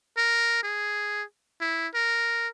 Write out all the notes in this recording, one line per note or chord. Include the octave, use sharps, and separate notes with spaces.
A#4
G#4
E4
A#4